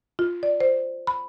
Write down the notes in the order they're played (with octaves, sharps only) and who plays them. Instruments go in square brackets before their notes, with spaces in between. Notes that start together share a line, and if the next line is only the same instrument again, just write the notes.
[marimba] F4
D5
C5
B5